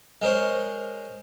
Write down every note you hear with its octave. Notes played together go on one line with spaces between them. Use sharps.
G#3 A#4 C5 C#5